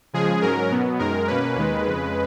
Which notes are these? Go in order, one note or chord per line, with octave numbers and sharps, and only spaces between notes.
C#3 F3 G#3 G#4
G#2 F#3 C#4 A#4
B2 F#3 B3
F#2 D#3 G#3 A#4
B2 A#3 C#4 B4
D#2 D#3 G#3
F2 C#3 G#3